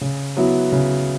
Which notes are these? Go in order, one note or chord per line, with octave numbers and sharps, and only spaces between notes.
C#3
F#3 B3 E4
C#3